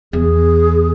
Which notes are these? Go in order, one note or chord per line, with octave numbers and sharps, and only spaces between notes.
E2 G#4